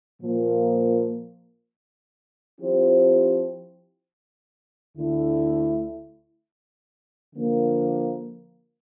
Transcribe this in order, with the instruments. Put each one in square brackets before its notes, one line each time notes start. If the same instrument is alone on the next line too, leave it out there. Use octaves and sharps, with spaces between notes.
[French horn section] A#2 F3 A#3
F3 C4 E4 G4 C5
D2 D3 A3 E4
D3 F3 A#3